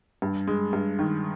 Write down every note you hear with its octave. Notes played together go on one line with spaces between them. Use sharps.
G2
G#3
G2
D#3